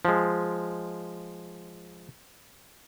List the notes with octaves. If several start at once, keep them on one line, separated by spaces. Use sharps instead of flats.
F3 G#3